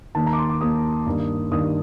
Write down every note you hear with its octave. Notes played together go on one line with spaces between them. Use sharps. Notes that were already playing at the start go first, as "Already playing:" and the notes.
D#2 D#3 A#3 A5
A#5
D6
C6
D6
D#2 D#3 A#3 D#6
G2 D#3 A#3
G2 D#3 A#3 D#6